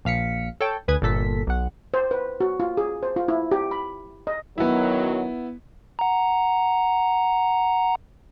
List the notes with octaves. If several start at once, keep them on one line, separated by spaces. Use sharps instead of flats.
A#1 F5 B6 C#7
A4 C#5 G5
D2 B4 G#5 D#6 G#6
G1 A#2 A4 B6
B1 F#5
C5
B4
F#4
F4
G#4
C5
F4
E4
G4
B5
D#5
F#2 D#3 F#3 B3 E4
F#5 A#5